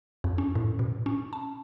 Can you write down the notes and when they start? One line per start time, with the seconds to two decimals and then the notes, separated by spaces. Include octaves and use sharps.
0.24 F2
0.38 C#4
0.55 A2
0.79 B2
1.06 C#4
1.33 A5